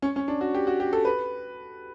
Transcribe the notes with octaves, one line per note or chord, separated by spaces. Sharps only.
C#4
C#4
D4
F#4
G4
F#4
G4
A4
B4